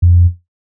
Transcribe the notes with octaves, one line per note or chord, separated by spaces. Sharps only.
F2